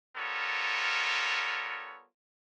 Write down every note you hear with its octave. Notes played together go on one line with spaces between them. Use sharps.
G3 B3 F4 A4 A#4 C#5